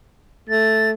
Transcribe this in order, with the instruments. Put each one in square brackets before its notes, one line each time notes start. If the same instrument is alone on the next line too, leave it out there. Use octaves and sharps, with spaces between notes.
[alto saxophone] A3 [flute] A6